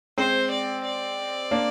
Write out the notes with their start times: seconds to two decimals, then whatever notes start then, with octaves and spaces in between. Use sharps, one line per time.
0.17 G#3 C4 C5
0.51 D5
0.84 D5
1.51 A#3 D4